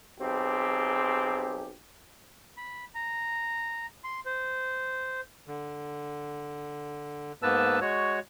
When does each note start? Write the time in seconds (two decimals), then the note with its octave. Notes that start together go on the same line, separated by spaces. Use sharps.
0.21 B1 C4 G4 G#4
2.57 B5
2.95 A#5
4.04 C6
4.26 C5
5.47 D3
7.42 G#2 A#3 B3 B4 A5 E6
7.81 G#3 F#4 C#5